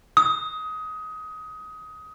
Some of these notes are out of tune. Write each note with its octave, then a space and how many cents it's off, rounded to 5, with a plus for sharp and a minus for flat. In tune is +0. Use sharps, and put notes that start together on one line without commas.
D#6 +20